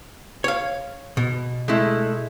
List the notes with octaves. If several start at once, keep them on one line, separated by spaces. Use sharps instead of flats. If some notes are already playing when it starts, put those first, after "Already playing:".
C#5 F5
B2
G#3 A3 E4